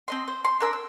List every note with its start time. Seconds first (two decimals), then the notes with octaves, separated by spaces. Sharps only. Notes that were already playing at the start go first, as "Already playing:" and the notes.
0.08 C4 D#5 C6
0.28 C5
0.44 C6
0.60 D4 A#4 E6
0.73 E6